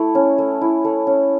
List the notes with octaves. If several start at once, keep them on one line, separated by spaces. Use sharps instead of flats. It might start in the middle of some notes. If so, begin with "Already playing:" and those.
Already playing: A3 E4
C#4
A3
E4
A3
C#4